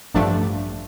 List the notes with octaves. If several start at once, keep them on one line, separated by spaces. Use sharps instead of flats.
A1 G2 F3 A3 D4